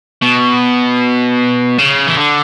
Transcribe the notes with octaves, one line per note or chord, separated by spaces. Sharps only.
B2
C#3
E3
D3